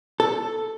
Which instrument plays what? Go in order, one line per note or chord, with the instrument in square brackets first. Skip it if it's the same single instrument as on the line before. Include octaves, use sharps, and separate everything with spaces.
[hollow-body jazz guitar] A4